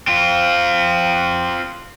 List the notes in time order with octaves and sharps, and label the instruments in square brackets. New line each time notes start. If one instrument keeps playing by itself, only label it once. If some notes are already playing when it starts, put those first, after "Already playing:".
[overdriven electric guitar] C4 F4